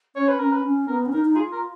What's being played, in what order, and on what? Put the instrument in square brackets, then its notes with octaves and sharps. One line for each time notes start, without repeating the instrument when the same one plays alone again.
[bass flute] C#4 [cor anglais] C#5
[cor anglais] B4
[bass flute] C#4 [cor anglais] A#4
[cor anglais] B4
[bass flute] C#4
[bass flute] B3 [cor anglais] A#4
[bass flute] C#4
[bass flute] D#4 [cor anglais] A#4
[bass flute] D#4
[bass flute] F4 [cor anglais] G#4
[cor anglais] A#4